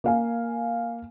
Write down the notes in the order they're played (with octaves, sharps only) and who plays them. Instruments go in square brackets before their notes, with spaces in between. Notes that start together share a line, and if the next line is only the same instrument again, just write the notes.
[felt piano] A#3 F5 G#5